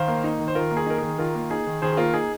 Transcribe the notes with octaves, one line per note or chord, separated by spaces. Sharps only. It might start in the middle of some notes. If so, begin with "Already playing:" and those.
Already playing: D#3 C5 F5
A#3
D#4
D#3
C5
D#3 F4 A#4
A#3
G#4
D#4 A#4
D#3 G#4
D#3 F4 A#4
A#3
D#4 G#4
D#3
D#3 G#4 C5
G#4
A#3 F4 A#4
D#4 G#4